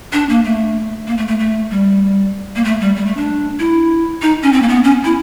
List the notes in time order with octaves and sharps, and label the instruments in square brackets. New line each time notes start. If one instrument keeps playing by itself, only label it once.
[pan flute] D4
A#3
A3
A#3
A3
A3
A3
G3
A#3
A3
G3
G3
A3
D4
E4
D#4
C#4
C4
A#3
B3
C#4
E4